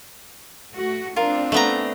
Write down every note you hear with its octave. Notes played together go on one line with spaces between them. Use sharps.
A3 F#4
C4 D4 F4 A#4
A3 B3 A#5